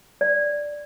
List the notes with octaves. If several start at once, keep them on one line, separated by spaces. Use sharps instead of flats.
D5